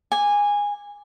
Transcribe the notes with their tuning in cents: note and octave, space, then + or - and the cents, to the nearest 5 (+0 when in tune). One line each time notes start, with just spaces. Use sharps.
G#5 -15 D6 +0